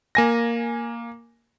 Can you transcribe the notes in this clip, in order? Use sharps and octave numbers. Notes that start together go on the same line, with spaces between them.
A#3 G#5 A#6